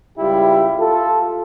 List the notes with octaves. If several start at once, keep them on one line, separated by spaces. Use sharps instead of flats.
C#2 G3 E4 F4 G4
F4 A4